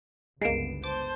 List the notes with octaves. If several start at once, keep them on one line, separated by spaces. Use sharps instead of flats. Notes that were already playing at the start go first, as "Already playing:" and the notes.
G1 C#2 G#3 A#3 B3 C7 D7 E7
C5 A5 D6